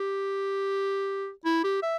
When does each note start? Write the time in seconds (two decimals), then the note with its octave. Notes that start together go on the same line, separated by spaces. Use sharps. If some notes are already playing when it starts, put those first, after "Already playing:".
Already playing: G4
1.45 E4
1.64 G4
1.83 E5